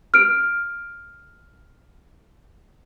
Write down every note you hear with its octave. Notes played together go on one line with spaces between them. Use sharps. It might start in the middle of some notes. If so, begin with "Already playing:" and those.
F6 D7